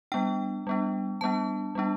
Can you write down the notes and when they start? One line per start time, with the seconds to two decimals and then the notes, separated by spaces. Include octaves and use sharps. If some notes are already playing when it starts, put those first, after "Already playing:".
0.12 G3 B3 D4 G5
0.67 G3 B3 D4
1.21 G3 B3 D4 A5
1.75 G3 B3 D4